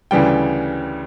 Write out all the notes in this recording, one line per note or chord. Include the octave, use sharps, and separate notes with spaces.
D2 C#3 E3 G3 G5